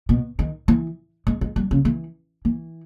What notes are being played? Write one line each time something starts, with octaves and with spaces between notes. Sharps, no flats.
B2
D#3
E3
G#3
G#3
G3
C#3
E3
E3